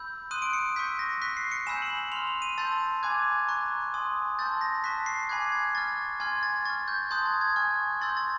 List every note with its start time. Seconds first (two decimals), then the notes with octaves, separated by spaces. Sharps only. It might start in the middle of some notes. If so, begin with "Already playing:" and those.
Already playing: B5 E6 G6
0.31 C6 D#6 F#6 D#7
0.42 D7
0.53 C#7
0.76 C#6 E6 G6 B6
0.99 A#6
1.22 C#6 F#6 B6
1.37 C7
1.52 C#7
1.67 G#5 B5 E6 G6 E7
1.82 F#7
1.97 F#7
2.12 C6 F6 F7
2.27 F7
2.42 D#7
2.58 A5 C6 E6 G6 A6
3.03 G#5 B5 D6 F#6 G#6
3.48 A#5 C#6 F#6
3.94 G#5 C6 D#6
4.39 A5 C6 E6 G6 A6
4.61 A#6
4.84 A5 C#6 F#6 B6
5.06 C7
5.29 G#5 B5 D6 F#6 G#6
5.52 G#6
5.75 C#6 F6 A6
6.20 G#5 C6 F6 G#6
6.43 A6
6.65 C#6 F6 A6
6.88 G6
7.11 A5 C6 D#6 F#6 G6
7.26 G#6
7.41 G#6
7.56 G#5 C#6 F6
8.01 C6 E6 G6 A6
8.17 A6